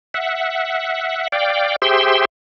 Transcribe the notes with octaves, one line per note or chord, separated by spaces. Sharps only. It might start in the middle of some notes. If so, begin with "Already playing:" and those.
E5 F#5
D5 F5 G5
G4 G#4 C5 E5 G5 C6